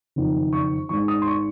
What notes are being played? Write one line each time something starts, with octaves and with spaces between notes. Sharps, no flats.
F#1 F2 D#3
C#6
G#1 G#2 D#3 C#6
D#6
C6
C#6